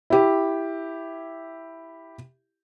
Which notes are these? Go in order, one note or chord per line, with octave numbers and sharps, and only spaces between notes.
E4 G4